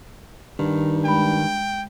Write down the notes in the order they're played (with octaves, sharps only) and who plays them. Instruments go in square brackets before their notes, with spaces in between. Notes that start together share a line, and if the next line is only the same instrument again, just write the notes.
[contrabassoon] G2 [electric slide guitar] D#3
[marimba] G#3 B5 [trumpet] G5